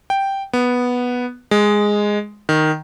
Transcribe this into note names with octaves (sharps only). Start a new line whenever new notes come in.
G5
B3
G#3
D#3